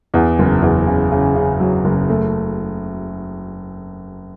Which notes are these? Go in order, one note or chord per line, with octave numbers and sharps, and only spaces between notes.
E2
F#1
E2
C#3
C#3
C#3
F#3
F#1
A3